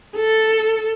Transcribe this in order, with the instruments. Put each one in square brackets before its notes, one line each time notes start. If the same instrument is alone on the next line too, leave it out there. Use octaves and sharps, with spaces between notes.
[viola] A4